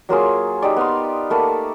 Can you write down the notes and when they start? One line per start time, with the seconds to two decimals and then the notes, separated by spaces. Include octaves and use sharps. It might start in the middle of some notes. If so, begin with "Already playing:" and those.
0.09 F#3 A#3 F4 G#4
0.62 D#4 G4 D5
0.76 B3 F5 C6
1.30 A3 A#3 A5 B5